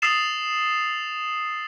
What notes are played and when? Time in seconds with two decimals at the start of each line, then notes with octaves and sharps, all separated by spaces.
0.02 D#6 E6 A6 C7 E7 F7